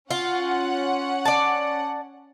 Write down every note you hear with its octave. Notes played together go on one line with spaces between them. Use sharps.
C#4 F4 F#5
D5 A5